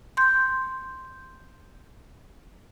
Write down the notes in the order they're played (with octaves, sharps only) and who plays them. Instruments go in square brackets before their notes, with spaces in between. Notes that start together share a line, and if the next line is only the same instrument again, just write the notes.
[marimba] C6 G6